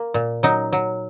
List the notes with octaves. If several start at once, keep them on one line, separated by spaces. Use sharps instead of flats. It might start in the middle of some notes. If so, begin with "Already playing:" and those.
Already playing: A#3
A#2
F#3 D#4
F#3